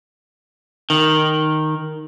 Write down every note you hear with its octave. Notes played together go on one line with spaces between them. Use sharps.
D#3